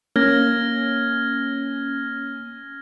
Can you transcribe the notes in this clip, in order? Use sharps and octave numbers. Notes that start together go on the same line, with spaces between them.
A#3 C#4 F6 G#6 A#6